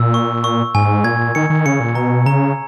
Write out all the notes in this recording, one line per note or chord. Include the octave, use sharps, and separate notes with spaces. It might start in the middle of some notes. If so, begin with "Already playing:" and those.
Already playing: A#2 E6
C#6
C#6
G#2 G#5
A#2 G#6
D#3 C#7
D#3
C#3 C#7
A#2
B2 A#5
C#3 A#5